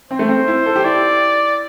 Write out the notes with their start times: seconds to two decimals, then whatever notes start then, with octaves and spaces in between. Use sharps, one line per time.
0.11 C4 C5
0.19 A3
0.28 C4
0.48 E4
0.66 A4
0.76 G4
0.85 E4 D5